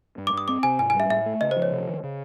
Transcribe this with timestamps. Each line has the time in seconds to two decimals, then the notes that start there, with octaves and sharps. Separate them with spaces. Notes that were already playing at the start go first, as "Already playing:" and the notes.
0.18 G2
0.27 D6
0.33 G2 D#6
0.48 C4 D6
0.63 C3 G#5
0.79 G#2 G#5
0.90 G#5
0.94 G3
1.00 E5
1.10 A2 E5
1.26 A3
1.41 C#3 D#5
1.51 C5
1.56 F3
1.62 C#5
1.72 C3
1.88 D#3
2.03 C#3